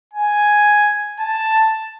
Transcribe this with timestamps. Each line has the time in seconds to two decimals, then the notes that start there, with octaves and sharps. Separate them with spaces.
0.14 G#5
1.20 A5